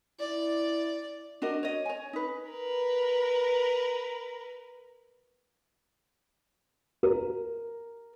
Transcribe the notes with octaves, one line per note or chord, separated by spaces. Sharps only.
E4 D5
D4 F#4 A#4 D#5
C#5 D#5
C#5 G#5
D#4 B4
A#4 B4
A#4